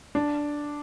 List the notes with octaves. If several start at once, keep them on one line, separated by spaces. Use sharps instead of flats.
D4